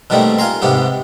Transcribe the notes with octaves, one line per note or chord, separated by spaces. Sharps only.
B2 D#3 G3 A3 A#3 C4
F4 G#5 A#5 C6
G#2 C3 B3 G4